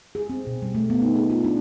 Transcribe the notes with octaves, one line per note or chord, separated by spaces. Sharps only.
G#4
C4
B2
G3
A3
B3
D#4
G#4
F4
D4